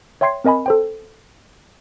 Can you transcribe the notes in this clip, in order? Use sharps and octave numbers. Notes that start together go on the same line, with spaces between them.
C#5 E5 G5 C6 G#6 C7
C4 A#4 D#5 G#5 B5
A4 C5 G5